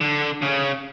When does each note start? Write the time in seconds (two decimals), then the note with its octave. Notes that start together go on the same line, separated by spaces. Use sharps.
0.01 D3
0.42 C#3